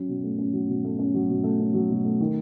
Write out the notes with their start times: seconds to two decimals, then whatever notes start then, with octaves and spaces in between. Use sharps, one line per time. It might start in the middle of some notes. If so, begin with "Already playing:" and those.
Already playing: F#3 C#4
0.09 B2
0.23 A3
0.39 C#4
0.53 F#3
0.69 B2
0.84 A3
0.99 C#4
1.14 F#3
1.29 B2
1.44 A3
1.60 C#4
1.74 F#3
1.90 B2
2.04 A3
2.20 D#3